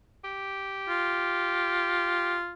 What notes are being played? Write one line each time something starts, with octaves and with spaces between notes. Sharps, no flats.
G4
F4